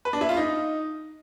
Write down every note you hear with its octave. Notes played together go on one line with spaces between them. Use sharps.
B4
D4
E4
F4
D#4